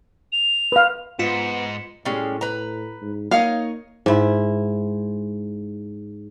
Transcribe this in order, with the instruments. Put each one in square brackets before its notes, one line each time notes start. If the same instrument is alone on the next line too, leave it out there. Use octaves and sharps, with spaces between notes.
[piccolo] F7
[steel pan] B4 F5
[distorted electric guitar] G#2 [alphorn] B3 [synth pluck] F4 [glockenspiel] B6 C#7 E7
[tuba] A2 [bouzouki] G3 G#3 C#4
[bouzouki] B4 A#5
[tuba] G#2
[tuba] A#3 [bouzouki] D#4 C#5 D#5 [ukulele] F5
[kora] G#2 E4